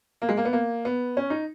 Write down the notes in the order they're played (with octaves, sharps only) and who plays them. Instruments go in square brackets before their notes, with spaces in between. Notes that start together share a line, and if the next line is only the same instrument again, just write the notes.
[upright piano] A#3
G#3
A#3
B3
A#3
B3
C#4
D#4